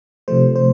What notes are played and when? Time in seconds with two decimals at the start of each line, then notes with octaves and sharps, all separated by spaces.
0.28 C3 F3 A3 C5
0.56 C5